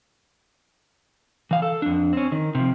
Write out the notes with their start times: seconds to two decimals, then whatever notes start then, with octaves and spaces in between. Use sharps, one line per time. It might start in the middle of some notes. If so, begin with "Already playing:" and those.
1.51 E3 F5
1.62 A4
1.82 F2 D4
2.13 C4 C#4
2.32 D#3
2.55 C3 F3